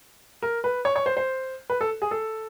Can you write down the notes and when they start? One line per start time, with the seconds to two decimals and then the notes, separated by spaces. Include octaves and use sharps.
0.42 A#4
0.64 B4
0.85 C#5
0.96 C#5
1.06 C5
1.17 C5
1.70 B4
1.81 A4
2.02 G#4
2.11 A4